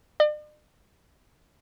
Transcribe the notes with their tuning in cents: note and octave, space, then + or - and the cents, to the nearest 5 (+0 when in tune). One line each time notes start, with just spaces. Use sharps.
D5 +45